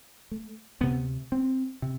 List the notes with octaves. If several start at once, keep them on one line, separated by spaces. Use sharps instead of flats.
A3
D2 C3 B3
C4
C3